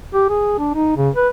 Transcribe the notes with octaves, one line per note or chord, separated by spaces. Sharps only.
G4
G#4
D4
D#4
C#3
B4